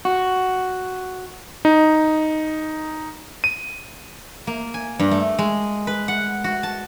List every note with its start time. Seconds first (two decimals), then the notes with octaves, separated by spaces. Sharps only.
0.05 F#4
1.65 D#4
3.44 D#7
4.47 A#3
4.74 G#5
4.99 G2
5.11 A3
5.39 G#3
5.87 B4
6.08 F#5
6.44 F#4
6.63 A5